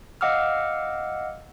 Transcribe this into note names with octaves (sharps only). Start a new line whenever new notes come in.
D#5 F5 F#5 D6 E6 F6